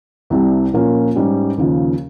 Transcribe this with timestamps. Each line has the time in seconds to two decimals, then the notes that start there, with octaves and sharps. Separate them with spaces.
0.30 C2 C3 G3
0.73 A#2 F3 A#3 C#4
1.15 G#2 G3 C#4
1.57 D#2 C#3 F3